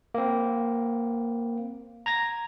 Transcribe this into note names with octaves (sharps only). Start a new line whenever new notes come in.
A#3 C4
A#5 G#6 A#6